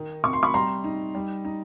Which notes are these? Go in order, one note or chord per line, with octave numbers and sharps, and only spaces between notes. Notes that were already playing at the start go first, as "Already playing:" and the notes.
Already playing: D#3 D#4
C3 C#6
C6
B5 C#6
G3 A#5 C6
D#4
G3
D#4